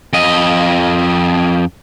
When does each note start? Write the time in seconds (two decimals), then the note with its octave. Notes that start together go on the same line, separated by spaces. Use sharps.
0.13 F2 D#5